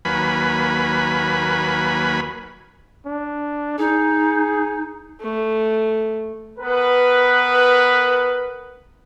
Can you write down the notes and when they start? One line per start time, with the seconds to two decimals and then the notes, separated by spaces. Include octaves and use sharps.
0.05 D#2 F#3 A#3 B4 G#5 B5
3.06 D4
3.78 D#4 G#4
5.21 A3
6.59 B3 A#4 B4